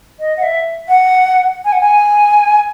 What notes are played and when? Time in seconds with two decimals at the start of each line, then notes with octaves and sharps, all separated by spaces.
0.20 D#5
0.37 F#5
0.43 E5
0.89 F#5
1.65 G#5
1.73 F#5
1.81 G#5